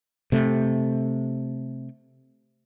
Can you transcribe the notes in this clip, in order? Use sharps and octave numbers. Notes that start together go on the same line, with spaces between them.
C3 A3